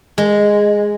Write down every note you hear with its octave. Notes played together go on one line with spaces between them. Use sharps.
G#3